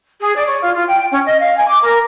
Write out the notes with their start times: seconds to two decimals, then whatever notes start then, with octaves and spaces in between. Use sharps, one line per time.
0.19 G#4
0.35 D5
0.46 C#5
0.60 F4
0.74 F4
0.87 G5
1.10 C#4
1.25 D#5
1.39 F5
1.57 G#5
1.69 D6
1.82 A#4